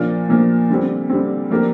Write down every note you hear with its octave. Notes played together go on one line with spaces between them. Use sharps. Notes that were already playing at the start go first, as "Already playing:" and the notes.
Already playing: A#2 F3 A#3 D4 F4
A#2 F3 A#3 D4 F4
D3 G3 C4
D3 G3 C4
F3 A#3 D4 G4 A#4